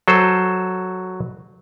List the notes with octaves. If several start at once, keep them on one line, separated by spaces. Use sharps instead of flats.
F#3 A4 C5